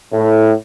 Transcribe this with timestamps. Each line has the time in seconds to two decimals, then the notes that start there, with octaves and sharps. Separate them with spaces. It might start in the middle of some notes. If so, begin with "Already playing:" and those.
0.13 A2